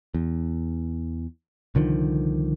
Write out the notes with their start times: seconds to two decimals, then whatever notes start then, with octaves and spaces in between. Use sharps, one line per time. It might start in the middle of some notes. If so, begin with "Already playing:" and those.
0.14 E2
1.75 C2 D3 D#3 F3